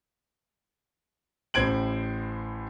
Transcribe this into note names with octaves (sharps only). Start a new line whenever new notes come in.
A1 A2 C5 G#6 D7 F#7